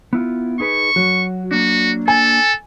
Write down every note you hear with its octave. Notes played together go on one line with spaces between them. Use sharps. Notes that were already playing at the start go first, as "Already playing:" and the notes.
B3 E4 F4
D#4 G#4 B4 C#6
F#3 F#4
A#3 D4 F#4
A4 G#5